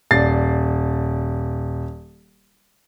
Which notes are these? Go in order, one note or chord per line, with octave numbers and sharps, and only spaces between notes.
D#1 D5 A6 C7